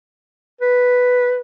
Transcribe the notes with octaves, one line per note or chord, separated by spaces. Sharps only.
B4